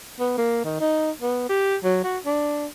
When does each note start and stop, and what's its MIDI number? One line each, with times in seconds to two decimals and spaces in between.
0.20 0.34 59
0.38 0.62 58
0.64 0.79 51
0.80 1.11 63
1.22 1.47 59
1.49 1.76 67
1.84 1.99 54
2.04 2.18 66
2.25 2.66 62